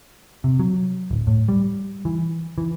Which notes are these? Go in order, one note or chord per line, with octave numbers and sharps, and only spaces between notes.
C3
F#3
D1
A2
G3
E3
E3